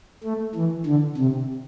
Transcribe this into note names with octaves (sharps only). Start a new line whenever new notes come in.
A3
E3
D3
C3